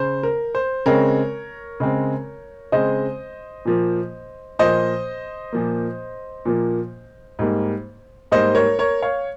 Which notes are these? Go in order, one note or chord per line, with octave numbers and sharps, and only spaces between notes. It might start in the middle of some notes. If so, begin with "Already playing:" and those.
Already playing: C#3 C5
A#4
C5
C#3 G#3 C4 A#4 C#5
C#3 G#3 C4
C#3 G#3 C4 C5 D#5
A#2 F3 A#3
A#2 F3 A#3 C5 D#5
A#2 F3 A#3
A#2 F3 A#3
G#2 G3 A#3
G#2 G3 A#3 C5 D#5
A#4 C#5
A#4 C#5
C#5 F5